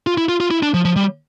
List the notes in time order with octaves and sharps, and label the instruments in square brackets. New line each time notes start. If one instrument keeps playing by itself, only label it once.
[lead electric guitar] F4
E4
F4
F4
E4
D4
F3
F3
G3